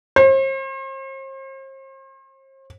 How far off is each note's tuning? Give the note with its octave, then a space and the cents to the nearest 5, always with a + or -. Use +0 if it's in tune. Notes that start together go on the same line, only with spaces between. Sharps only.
C5 +40